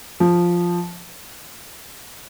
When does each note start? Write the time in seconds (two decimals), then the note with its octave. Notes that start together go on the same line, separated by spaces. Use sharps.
0.20 F3